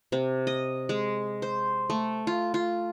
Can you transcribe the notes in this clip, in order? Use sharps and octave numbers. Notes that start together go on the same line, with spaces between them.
C3
D#5
G#3
C5
A3
F4
F4